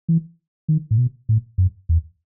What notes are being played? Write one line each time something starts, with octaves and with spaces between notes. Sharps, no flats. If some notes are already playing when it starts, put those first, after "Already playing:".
E3
D#3
A2
B2
A2
F#2
E2